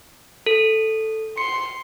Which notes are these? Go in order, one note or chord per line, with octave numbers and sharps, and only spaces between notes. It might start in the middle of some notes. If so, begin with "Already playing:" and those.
A4
C6 C#7